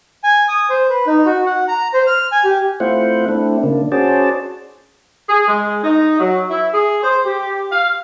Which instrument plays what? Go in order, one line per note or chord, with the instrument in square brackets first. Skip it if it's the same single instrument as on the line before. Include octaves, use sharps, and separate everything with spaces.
[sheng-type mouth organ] G#5
D#6
C5
B4
D#4
F#4
F#5
A#5
C5
F6
G#5
G4
[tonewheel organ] A3 C4 E4 F4 C5 F#5
A3 C4 D4 E4
C#3 A#3 D4
C#4 F#4 G#4 C5 D5 A5
[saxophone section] G#4
G#3
D#4
F#3
E4
G#4
C5
G4
F5